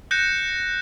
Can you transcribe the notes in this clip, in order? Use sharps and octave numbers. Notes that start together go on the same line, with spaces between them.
F#6 G6 A#6 C#7 E7